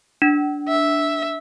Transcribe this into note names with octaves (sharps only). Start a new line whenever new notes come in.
D4
E5